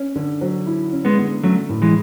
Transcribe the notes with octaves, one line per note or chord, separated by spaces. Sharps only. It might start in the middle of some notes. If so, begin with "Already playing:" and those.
Already playing: C#4
D3
F#3
E4
C#4
G#3 B3
D3
F#3 A3 C#4
A2
E3 G#3